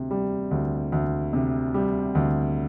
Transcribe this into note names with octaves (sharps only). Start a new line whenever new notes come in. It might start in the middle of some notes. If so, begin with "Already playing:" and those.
Already playing: D2 C3
G3
D2
D2
C3
G3
D2